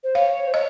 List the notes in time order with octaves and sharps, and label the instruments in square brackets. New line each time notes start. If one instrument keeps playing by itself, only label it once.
[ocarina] C5
[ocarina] C#5 [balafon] F5
[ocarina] C5
[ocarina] C#5 [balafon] D#5